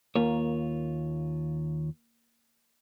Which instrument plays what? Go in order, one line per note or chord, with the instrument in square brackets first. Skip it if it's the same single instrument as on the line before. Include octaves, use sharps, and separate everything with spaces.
[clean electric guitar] D#2 F4 C#5 [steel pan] A#3